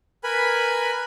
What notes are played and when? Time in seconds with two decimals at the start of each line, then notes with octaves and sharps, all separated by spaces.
0.24 A#4 B4 G#5 B5